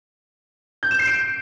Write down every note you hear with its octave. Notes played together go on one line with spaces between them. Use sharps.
G6
E7
C7
D7